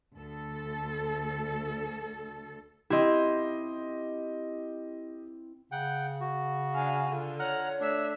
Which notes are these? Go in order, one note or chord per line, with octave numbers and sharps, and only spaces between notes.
D2 A4
C4 E4 G4 D#5
C#3 F#5 G5
F#4
D4 F5 G#5
D3 F4
C#5 F#5 A#5 F6
A3 D4 E5